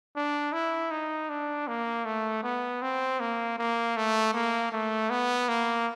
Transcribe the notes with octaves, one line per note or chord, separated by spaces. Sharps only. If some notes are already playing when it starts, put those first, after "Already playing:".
D4
E4
D#4
D4
A#3
A3
B3
C4
A#3
A#3
A3
A#3
A3
B3
A#3